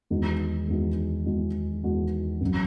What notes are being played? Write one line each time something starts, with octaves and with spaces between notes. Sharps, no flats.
E2 D#3 G#3 D#4 F#4
E2 D#3 G#3 D#4 F#4
E2 D#3 G#3 D#4 F#4
E2 D#3 G#3 D#4 F#4
A1 F#3